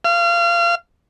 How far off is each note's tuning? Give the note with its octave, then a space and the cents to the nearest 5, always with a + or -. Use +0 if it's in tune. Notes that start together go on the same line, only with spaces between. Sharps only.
F5 -30